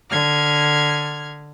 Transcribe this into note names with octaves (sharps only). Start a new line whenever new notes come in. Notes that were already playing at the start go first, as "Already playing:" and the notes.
D3 F6 G#6